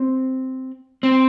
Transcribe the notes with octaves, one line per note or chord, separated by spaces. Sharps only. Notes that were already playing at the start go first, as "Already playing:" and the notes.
Already playing: C4
C4